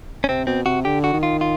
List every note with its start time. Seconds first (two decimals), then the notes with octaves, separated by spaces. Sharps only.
0.24 C#4
0.29 C3 C4
0.47 B2 C4
0.66 C3 F#4
0.85 D3 G4
1.04 F#4
1.13 D#3
1.23 F4
1.41 F4